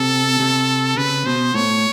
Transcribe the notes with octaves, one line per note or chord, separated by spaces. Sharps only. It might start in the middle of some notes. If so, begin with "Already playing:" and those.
Already playing: C3 A4
C3
C#3 B4
B2 C5
A2 C#5